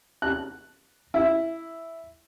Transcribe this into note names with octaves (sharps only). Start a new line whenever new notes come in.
F#6
E4